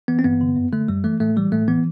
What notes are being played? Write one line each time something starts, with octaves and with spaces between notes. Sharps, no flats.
E3 B3
C4
G2 B3
D3
F#2
D3 A3
F#2 G3
E3 A3
A2 A3
E3 G3
A2 A3
E3 B3